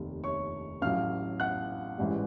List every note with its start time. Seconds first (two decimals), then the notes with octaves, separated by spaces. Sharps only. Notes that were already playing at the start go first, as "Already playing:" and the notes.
Already playing: F1 D#2 D#3
0.24 C#5 C#6
0.82 A1 A2 F#3 F5 F6
1.40 F#5 F#6
1.98 A1 G#2 E3 G3